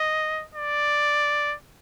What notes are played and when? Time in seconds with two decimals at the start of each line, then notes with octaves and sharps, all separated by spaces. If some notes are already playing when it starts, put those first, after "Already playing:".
Already playing: D#5
0.55 D5